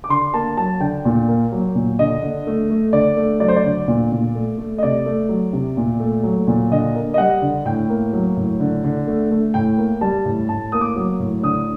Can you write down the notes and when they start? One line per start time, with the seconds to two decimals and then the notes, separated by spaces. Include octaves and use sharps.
0.04 D6
0.10 D3 C6
0.33 A#3 A5
0.57 F#3 A5
0.80 D3 G5
1.05 A#2
1.28 A#3
1.52 F#3
1.75 A#2
1.99 D3 D#5
2.22 D3
2.47 A3
2.70 A3
2.93 D3 D5
3.17 A3
3.40 F#3 D5
3.48 C5
3.56 D5
3.65 D3
3.88 A#2
4.12 A#2
4.35 A3
4.58 A3
4.78 D#5
4.83 C3 D5
5.06 A3
5.29 F#3
5.53 C3
5.77 A#2
6.00 A3
6.23 F#3
6.47 A#2
6.71 D3 D#5
6.95 A#3
7.14 D#5
7.18 G3 F#5
7.42 D3
7.65 A2 G5
7.89 A#3
8.13 F#3
8.37 A2
8.60 D3
8.84 D3
9.07 A3
9.31 A3
9.54 A2 G5
9.78 A#3
10.01 G3 A5
10.25 A2
10.49 A2 A5
10.72 A#3 D#6
10.81 D6
10.96 F#3
11.19 A2
11.43 D3 D#6